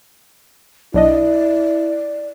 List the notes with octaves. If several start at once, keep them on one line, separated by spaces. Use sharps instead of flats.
B1 D4 E4 D5 D#5